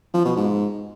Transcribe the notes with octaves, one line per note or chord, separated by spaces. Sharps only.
F3
B2
G#2